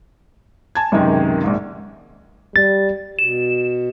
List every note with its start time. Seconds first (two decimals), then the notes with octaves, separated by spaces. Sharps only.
0.75 G#5 A5 G#6
0.92 C#2 F#2 C3 D#3 G#3
1.44 A#1 G#2
2.56 G3 A6
3.19 B2 E7